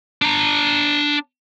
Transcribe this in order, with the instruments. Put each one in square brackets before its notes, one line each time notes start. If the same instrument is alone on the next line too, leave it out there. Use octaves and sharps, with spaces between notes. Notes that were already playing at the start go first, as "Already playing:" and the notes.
[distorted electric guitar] D4 A#5